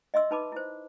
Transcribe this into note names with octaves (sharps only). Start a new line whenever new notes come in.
D#5 E5 C6 E6
D#4 B4 A5 B5 D6
E4 C5